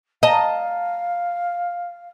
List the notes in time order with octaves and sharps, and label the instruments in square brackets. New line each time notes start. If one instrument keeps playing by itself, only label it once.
[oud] D#5 [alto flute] F5 [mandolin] A5 A#5